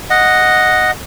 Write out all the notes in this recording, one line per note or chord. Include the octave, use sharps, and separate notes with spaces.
D#5 F#5